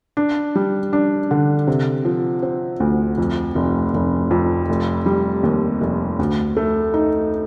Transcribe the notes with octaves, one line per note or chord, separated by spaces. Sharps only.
D4
G3
D4
D3
C3
F3
C4
D2
F2
F1
F1
F2
F1
G3
D#2
F1
D2
A3
D#4